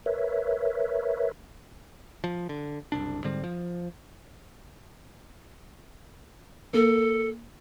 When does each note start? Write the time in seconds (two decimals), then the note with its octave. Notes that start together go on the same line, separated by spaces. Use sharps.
0.06 A#4 B4 C#5 E5
2.24 F3
2.49 D3
2.92 F#1 C2 D4
3.24 G#2 D3 G3 C4
3.44 F3
6.73 A#3 A4